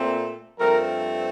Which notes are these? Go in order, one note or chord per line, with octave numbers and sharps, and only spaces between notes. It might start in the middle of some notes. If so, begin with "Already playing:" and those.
Already playing: A#2 A3 C4
G2 F3 A3 C4 A#4